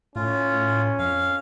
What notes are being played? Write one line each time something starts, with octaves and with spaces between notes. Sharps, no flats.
A2 C#4 F4
F2 F5